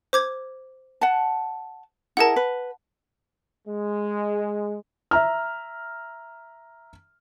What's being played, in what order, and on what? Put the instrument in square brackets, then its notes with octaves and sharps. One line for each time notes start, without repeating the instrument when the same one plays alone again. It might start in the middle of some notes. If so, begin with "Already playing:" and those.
[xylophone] C5 D6 G#6
[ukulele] F#5 A5
[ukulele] E4 G#4 A#4 [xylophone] F#5 A5
[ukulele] B4
[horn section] G#3
[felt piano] E5 A#5 F6